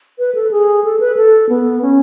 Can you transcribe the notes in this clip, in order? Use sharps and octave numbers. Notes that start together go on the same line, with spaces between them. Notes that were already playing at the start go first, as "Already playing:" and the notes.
B4
A4
G#4
A4
B4
A4
B3
C#4